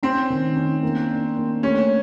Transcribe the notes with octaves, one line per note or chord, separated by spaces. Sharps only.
C4 C#4
D#3
C#4
A#3
D4
A#3
A3 C#4